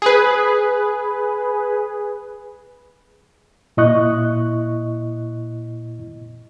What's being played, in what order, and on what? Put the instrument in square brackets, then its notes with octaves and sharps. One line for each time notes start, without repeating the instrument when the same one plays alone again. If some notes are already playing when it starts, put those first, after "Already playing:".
[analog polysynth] G#4 B4
[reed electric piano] A#2 E4 D#5 C#6 F#6